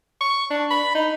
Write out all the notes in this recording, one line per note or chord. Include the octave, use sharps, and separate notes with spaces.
C#6
D4
B5
D#4